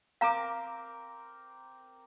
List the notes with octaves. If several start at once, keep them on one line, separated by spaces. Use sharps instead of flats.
C4 A#4 F5 A#5 D6